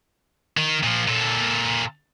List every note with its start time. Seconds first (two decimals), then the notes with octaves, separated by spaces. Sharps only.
0.57 D#3
0.83 A#2 F3
1.08 A#2 A4